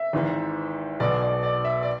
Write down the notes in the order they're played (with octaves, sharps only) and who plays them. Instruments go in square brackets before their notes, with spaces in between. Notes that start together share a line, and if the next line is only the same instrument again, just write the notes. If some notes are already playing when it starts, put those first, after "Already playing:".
Already playing: [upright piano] E5
G#1 G#2 E3
B1 B2 D5
D5
D5
E5
D5